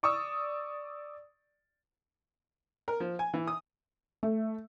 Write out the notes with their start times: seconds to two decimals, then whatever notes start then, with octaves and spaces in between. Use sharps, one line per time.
0.03 D5 C#6 D#6 E6
2.88 A#4
3.00 F3
3.19 G#5
3.34 E3
3.47 D#6
4.23 A3